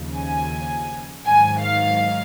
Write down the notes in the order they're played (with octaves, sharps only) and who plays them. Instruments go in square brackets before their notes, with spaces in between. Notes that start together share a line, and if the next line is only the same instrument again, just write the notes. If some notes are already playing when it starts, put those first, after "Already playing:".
Already playing: [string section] D#2 C#3 F3
G#5
G#2 D#3 F#3 G#5
F5